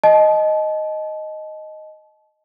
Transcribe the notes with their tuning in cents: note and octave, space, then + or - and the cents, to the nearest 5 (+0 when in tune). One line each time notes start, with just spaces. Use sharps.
D#5 +0 A5 -35